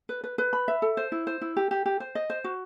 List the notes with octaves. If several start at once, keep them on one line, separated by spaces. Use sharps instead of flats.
B4
B4
B4
B5
E5
A4
C5
E4
C5
E4
G4
G4
G4
C5
D#5
C5
F#4